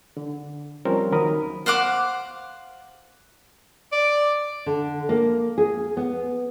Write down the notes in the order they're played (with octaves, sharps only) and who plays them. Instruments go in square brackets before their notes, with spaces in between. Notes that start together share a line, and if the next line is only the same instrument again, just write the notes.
[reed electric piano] D3
F3 G3 C4 C#4 A#4 C5
D#2 D#3 F#3 A#4 B5 D#6
[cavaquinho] C5 F5 F#5 D6
[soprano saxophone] D5
[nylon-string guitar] D3
A#3
G#4
B3